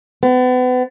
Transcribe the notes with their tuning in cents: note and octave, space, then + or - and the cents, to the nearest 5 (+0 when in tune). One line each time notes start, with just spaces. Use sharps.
B3 +35